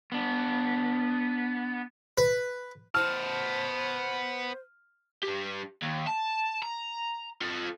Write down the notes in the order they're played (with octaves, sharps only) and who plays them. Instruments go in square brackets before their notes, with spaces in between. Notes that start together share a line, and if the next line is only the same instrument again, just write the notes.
[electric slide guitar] B3 D4
[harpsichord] B4
[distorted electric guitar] B3 A5 [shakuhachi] C5 [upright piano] F6
[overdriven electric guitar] D4 G4
D#2
A5
A#5
F4 A4